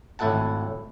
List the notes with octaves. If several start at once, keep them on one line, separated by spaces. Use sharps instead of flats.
G#1 A2 E4 A4 F#5 A5